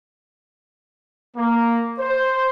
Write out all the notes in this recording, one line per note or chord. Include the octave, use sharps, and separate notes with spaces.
A#3
C5